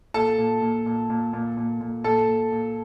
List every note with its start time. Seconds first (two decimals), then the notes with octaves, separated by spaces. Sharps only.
0.14 A#2 A4 A5
0.38 A#2
0.62 A#2
0.86 A#2
1.10 A#2
1.33 A#2
1.57 A#2
1.81 A#2
2.04 A#2 A4 A5
2.28 A#2
2.52 A#2